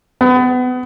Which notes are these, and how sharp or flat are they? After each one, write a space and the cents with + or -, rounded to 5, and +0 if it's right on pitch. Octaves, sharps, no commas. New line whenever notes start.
B3 +30